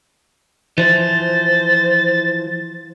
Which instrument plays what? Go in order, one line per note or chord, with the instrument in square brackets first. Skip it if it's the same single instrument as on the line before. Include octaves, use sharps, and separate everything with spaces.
[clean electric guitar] E3 F3 [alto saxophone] C5 [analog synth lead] A6